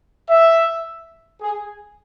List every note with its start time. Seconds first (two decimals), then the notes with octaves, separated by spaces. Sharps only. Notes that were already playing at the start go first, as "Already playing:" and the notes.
0.30 E5
1.41 G#4